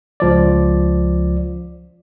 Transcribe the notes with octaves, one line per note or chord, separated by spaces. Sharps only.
C#2 F3 D5